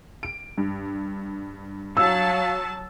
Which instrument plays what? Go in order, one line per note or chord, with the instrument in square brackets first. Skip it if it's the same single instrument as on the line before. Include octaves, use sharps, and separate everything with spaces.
[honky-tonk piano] D7
G2
[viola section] F#3 A5 [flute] F5 [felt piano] E6